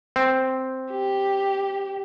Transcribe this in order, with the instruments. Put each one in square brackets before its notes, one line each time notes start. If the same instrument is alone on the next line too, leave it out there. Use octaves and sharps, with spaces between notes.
[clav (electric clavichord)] C4
[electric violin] G4